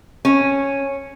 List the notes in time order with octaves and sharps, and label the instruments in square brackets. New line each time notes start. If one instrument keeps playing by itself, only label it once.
[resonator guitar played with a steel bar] C#4